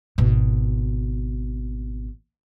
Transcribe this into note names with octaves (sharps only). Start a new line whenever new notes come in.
G#1 B2